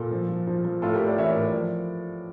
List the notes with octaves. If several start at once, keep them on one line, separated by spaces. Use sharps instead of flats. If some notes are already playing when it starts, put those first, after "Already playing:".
Already playing: A#2 F4 A4
F3
F3
F3
F3
A2 F4 A4
G4 A#4
A2
A#4 D5
E3 C#5 E5
A#4 D5
A2
A#4 D5
F3